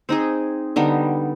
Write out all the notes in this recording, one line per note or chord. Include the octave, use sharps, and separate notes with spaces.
C4 D#4 G#4
D3 G3 B3 D#4